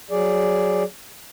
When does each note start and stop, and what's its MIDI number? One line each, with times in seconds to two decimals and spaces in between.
0.11 0.83 54
0.11 0.83 68
0.11 0.83 74